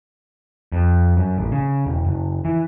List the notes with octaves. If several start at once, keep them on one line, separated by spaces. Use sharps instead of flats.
F2
F#2
A1
C#3
E1
F#1
E3